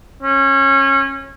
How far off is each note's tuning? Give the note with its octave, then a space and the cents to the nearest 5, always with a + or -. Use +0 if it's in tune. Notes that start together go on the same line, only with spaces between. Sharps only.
C#4 -25